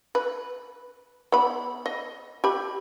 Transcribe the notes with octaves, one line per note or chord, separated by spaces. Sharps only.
B4
B3 B5
D#5
G4 B5